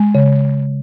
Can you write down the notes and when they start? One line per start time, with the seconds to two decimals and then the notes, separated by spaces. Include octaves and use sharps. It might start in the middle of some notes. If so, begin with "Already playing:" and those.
Already playing: G#3
0.15 C#3